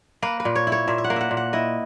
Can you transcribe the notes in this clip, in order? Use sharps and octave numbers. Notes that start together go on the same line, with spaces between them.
A#3 B4
B4
A#2
C#5
E4
C#5
A#2 E5
E5
F#5
A#3
E5 F#5
A#2
F#5
E4 D#5